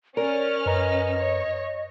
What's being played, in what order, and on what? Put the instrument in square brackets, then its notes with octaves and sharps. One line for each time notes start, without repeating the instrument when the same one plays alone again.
[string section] C#4 F6 [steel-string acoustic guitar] A#4 [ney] D5
[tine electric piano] F#2 B4 A#5 [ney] D#5
[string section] C#5